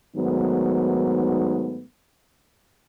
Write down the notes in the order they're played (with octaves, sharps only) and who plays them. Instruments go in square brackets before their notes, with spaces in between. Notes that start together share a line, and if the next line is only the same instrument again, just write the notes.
[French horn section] G#2 D#3 F#3 A3 B3